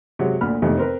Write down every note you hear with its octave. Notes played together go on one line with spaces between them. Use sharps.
C3 F#3 G#3
D2 A#2 B5 F6
F2 A2 C3 D#3
C4 A#4 B4